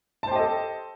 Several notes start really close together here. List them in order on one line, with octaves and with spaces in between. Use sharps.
A5 C5 G4 D#5 A4